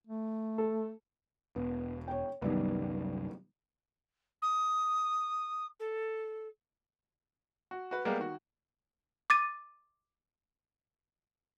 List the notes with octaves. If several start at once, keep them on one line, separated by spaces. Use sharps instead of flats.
A3
A4
E1 B3
C#5 G5
C2 F#2 D#3 G3 B3
D#6
A4
F#4
F#4 B4
G3 G#3 A#3 B3 G4 A#4
D#3 F#4
D6 A6 D#7